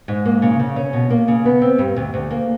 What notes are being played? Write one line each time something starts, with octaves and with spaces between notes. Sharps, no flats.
G#2
A#3
C#3
C#3
C#4
B2
A#3
C#3
B3
C4
G2
D2
D2
A#3